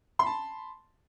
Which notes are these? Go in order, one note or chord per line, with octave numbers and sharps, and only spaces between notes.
A5 B5 C6